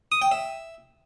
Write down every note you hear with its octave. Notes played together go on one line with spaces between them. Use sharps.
D#6
G5
E5